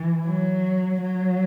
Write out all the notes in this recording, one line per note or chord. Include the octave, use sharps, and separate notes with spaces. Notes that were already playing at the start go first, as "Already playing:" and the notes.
Already playing: E3
F#3
F#3